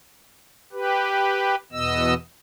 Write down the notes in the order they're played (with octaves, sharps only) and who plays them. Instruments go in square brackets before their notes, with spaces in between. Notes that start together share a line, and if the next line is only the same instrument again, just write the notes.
[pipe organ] G4 B4
E2 B2 B3 D#5 E6